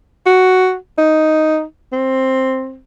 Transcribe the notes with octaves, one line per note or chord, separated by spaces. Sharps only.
F#4
D#4
C4